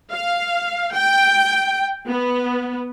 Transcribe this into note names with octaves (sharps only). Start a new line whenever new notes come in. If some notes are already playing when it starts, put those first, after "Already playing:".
F5
G5
B3